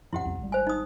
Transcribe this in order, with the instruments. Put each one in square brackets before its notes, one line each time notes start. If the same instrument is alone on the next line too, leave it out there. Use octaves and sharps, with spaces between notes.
[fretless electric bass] D#1 F#2 F3 [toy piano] E4 G4 F#5
[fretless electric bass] C2 F2
G#1 G3
[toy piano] C5 G#5
D#4 D#6